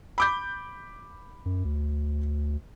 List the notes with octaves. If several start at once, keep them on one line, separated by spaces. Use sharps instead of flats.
B5 D6 G6
F#2
D2